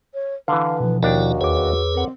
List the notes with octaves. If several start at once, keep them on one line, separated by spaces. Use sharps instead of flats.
C#5
D3 E3 B4 F5
B2 F3
D#2 D4 E4 F#4 A#4 D5 G5
E2 G#4 B4 C#5 D6
C4 A#4 F#5